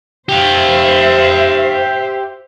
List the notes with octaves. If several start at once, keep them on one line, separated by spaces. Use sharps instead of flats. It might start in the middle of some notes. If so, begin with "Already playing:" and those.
G4 C5 E5 F5